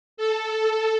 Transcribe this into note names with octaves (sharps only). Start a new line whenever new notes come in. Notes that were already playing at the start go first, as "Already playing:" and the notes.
A4